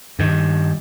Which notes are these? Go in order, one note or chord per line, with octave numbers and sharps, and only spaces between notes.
G2 D#3